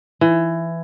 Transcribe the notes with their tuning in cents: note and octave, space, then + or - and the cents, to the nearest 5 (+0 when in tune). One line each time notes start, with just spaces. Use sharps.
E3 +15